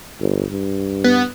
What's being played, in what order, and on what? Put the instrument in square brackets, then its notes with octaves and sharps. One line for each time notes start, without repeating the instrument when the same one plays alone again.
[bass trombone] G1
G2
[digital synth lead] B3